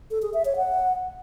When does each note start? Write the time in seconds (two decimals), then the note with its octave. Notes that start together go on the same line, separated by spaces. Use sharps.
0.11 A4
0.22 G#4
0.34 E5
0.45 C#5
0.57 F#5